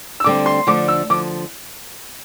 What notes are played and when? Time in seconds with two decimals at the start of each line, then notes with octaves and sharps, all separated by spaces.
0.20 E6
0.24 D2 D3 G3 C4 D6
0.46 C6
0.67 D3 F3 A3 D4 D6
0.88 E6
1.10 D3 F3 D6